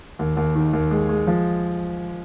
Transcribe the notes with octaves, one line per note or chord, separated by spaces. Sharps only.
D#2
D#2
D#3
D#2
G#3
G#3
F3